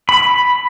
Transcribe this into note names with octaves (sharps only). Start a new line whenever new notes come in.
B5